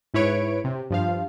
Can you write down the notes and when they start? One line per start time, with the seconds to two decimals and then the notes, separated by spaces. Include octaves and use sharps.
0.14 G#2 E4 B4 C#5 D7
0.64 C3
0.90 G2 F3 F5